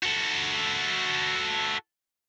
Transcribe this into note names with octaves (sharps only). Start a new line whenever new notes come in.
F#4 A4